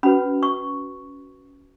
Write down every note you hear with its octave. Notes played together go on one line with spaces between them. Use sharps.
C#4 F#4 B4 B5
C#6